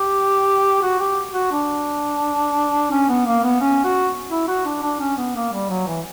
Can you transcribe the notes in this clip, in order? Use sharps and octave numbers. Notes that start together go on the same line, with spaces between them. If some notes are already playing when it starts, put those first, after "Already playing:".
Already playing: G4
F#4
G4
F#4
D4
C#4
B3
A#3
B3
C#4
F#4
E4
F#4
D4
D4
C#4
B3
A#3
G3
F#3
E3